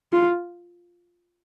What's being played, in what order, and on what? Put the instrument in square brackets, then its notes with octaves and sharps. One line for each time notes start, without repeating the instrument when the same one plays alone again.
[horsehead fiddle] F4